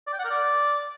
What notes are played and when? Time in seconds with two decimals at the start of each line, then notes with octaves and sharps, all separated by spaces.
0.07 D5
0.13 G5
0.19 F#5
0.25 A#4
0.30 D5